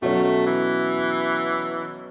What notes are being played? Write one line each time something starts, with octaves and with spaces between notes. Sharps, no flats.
B2 F#3 A3 C#4
A3
E3